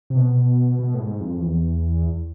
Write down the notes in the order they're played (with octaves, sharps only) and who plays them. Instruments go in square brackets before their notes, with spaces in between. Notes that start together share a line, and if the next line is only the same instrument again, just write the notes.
[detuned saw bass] C3
B2
B2
A2
G#2
F2
E2